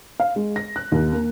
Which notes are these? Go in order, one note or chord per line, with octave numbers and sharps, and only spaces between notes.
F5
G#3
A#6
F#6
D#2
A#3